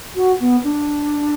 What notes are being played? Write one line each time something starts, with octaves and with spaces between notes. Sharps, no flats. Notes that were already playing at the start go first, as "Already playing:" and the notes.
F#4
B3
D4